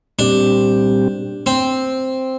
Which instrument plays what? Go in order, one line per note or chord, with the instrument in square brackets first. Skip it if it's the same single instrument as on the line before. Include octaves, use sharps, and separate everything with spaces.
[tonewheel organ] A#2 G3 C4 G4 [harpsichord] D4
[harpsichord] C4